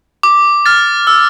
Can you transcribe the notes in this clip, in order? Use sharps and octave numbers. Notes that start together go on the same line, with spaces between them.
D6
F6 A6
E6